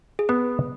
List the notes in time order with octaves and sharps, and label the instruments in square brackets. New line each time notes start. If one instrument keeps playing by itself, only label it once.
[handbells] G#4
[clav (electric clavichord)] B3 [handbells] B4